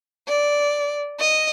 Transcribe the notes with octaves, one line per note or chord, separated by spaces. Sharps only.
D5
D#5